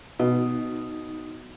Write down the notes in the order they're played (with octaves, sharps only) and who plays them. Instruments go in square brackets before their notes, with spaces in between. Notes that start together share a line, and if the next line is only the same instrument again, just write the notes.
[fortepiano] B2 [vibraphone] D#4